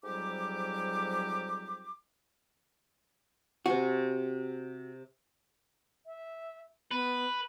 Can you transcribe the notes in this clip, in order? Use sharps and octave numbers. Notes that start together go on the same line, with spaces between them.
F2 G#2 F#3 G3 G4 D6
C3 F#4 C5 G#5
E5
B3 B4